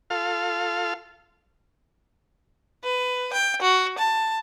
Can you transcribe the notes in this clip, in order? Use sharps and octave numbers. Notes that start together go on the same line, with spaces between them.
F4 A4 F5
B4
G5
F#4
A5